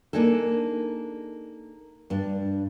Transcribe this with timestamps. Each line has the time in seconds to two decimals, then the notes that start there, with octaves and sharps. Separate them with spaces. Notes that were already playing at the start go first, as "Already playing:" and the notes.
0.13 A#3 D4 D#4 G#4 A4
2.10 G2 D4